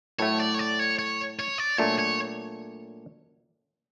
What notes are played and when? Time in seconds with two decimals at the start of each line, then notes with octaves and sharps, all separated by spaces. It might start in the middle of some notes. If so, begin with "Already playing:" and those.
0.19 A2 F#3 A3 C#5
0.40 D5
0.54 C#5
0.59 D5
0.79 C#5
0.99 C#5
1.39 C#5
1.58 D5
1.78 A#2 F#3 A3 D4 C#5
1.99 C#5